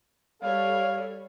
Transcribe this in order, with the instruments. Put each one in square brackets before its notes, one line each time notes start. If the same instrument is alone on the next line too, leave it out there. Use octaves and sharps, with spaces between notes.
[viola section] G3 A4 C#5 [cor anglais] F5